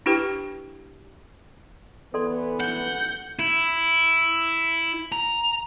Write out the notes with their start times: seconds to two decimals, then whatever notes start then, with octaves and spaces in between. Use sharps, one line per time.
0.06 D4 E4 G4 B4 G5
2.14 E3 B3 A4 B4 D5 C6
2.60 F#5 G6
3.39 E4
5.12 A#5